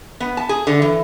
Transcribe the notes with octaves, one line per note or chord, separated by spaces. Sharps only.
B3
A5
G#4
D3
E3